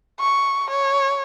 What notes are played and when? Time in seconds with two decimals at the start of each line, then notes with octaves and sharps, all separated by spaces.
0.20 C#6
0.70 C#5